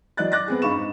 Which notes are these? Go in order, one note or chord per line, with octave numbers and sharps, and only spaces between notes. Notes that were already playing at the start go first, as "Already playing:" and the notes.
E3 F#3 D5 D#5 F#6 A6
D6 F#6 A6 A#6
B3 C4 G#4
G2 D#4 F5 B5 C#6 E7
G#2